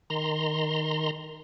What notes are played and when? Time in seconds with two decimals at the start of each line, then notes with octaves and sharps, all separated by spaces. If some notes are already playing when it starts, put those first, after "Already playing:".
0.10 D#3 A#5 C6